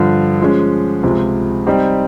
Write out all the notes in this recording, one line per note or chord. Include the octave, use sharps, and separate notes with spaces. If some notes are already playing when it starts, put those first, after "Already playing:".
Already playing: G2 D3 F3
F3 G#3 C#4
C#2 C3 F3 G#3
G3 C4 D#4 G4